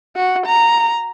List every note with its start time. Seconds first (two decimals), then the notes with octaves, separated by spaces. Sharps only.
0.16 F#4
0.46 A#5